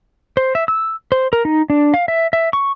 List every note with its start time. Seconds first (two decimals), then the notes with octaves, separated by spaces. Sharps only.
0.37 C5
0.55 E5
0.68 E6
1.12 C5
1.33 A#4
1.45 D#4
1.70 D4
1.94 F5
2.08 E5
2.33 E5
2.53 C#6